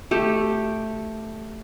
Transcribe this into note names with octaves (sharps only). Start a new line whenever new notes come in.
A3 G4